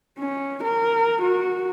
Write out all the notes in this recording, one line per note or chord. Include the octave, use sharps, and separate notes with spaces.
C#4
A#4
F#4